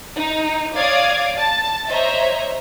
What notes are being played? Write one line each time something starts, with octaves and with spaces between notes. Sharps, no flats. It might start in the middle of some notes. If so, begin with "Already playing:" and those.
D#4
C#5 D5 F5 D6 D#6 G#6
A5 A6
C5 C#5 D#5 E5 A#5